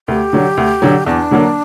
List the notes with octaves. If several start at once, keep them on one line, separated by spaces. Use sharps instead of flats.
D2 G4
D3 F#3
D2
D3 F#3
E2 D4
D3 F#3 A#3